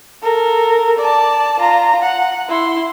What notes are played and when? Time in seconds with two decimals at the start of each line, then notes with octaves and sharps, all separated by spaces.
0.23 A4 A#4
0.99 D5 A5
1.59 F4 A#5
2.02 F#5
2.48 E4 C6